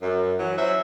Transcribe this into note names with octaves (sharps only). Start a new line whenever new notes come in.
F#2
E3 F#3
F#3 C#4 C5 E5